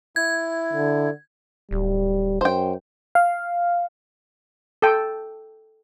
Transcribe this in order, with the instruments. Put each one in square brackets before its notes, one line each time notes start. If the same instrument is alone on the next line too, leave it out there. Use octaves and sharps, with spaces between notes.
[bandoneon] E4 [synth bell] G#6
[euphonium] D3
[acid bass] D1 [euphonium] G3
[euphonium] F#2 [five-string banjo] C5 G5
[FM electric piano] F5
[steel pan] A4 G5